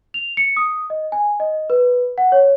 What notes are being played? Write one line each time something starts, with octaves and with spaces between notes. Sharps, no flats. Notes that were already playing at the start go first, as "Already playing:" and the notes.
F7
C#7
D#6
D#5
G#5
D#5
B4
F#5
C#5